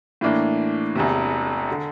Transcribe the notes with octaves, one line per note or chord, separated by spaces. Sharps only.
A2 E3 A#3 D4
E1 E2 C3
D3